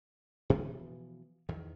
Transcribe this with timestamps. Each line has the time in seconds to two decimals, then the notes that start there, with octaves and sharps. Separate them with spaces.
0.50 B2 E3 F3 B3
1.49 E2 D#3